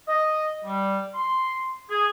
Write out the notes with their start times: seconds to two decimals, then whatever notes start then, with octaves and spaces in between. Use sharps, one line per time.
0.08 D#5
0.65 G3
1.15 C6
1.89 G#4